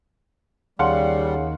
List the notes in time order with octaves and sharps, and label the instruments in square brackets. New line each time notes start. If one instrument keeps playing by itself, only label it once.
[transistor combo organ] D#2 [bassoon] C#3 [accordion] G3 [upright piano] F5 F#5 C6